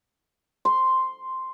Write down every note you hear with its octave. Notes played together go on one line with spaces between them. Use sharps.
C6